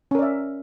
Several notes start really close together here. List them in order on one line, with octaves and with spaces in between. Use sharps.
C#4 A#4 D5 E5